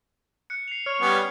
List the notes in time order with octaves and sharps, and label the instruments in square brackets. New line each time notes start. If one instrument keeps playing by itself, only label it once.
[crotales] F#6 C#7
C7 F7
[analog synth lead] C#5 [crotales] F6
[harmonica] G3 B3 C#4